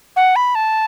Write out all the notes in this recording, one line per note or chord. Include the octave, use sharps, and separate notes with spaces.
F#5
B5
A5